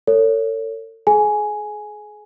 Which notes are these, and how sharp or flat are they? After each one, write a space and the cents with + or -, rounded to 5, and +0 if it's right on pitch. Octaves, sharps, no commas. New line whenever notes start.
A4 +45 C#5 +10
G#4 +35 G#5 +5